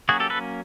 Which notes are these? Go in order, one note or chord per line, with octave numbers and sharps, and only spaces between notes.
F#3 A#3 C#4 F#4 G#4
G4 A4
A4 B4